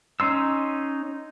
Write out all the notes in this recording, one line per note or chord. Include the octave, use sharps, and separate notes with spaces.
C#4 D#4 C6 E6